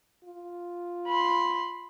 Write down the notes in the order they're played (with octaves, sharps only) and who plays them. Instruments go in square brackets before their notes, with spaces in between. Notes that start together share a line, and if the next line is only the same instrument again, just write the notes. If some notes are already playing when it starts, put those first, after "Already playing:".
[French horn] F4
[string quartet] B5 C6